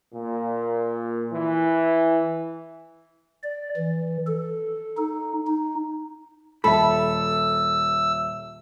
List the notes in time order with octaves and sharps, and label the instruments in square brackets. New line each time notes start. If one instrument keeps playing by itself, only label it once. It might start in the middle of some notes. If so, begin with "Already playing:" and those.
[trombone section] A#2
E3
[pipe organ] D5
E3
A4
D#4
D#4
[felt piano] D#1 E5 [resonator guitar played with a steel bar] A4 [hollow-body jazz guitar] B5 [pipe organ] E6